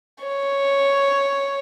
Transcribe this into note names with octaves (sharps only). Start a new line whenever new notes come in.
C#5